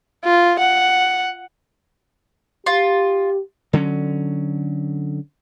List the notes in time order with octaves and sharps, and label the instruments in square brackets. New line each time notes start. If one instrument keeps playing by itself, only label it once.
[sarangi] F4
F#5
[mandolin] F4 [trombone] G4
[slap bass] D3 F#3 G3 C#4